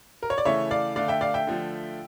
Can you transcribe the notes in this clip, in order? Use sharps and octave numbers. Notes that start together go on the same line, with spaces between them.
A#4
C#5
D5
C#3 E3 A3 C#5 E5
D5 F5
D3 A3 D5 F5
E5 G5
D5 F5
E5 G5
D3 F3 A3